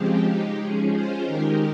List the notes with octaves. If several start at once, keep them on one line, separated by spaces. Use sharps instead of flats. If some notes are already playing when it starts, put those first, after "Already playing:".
Already playing: C#3 F3 G#3 C4 G4
G#3 D#4 G4
F3 G#3 C#4 G#4
G#3 C#4 F4 C5
D#3 G#3 D#4 G4 A#4